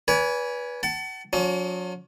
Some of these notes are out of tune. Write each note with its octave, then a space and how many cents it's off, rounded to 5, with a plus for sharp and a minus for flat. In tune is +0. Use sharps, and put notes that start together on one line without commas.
B4 -15 D5 -45 G#5 +0
F#5 +35 A5 +0
F#3 -40 C#4 +40